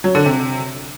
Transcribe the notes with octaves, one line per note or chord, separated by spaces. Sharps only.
F#3
D3
C3